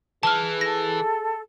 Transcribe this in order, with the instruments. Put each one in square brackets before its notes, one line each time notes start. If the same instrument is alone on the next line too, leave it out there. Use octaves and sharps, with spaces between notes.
[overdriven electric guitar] E3 [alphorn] G#4 [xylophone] A5 F6
[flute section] A4 [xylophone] A#6